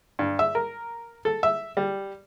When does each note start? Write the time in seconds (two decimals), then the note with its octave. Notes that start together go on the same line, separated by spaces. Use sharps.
0.19 G2
0.39 E5
0.55 A#4
1.25 A4
1.43 E5
1.77 G3